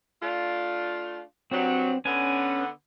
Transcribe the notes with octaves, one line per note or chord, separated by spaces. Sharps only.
A3 D4 F4
G2 F#3 C4
D3 B3 C#4 G#5